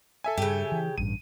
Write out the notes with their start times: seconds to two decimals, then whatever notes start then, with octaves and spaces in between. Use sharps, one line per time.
0.24 A4 E5 G#5
0.38 G2 C#3 G4
0.72 E3
0.98 A1 G2 D#7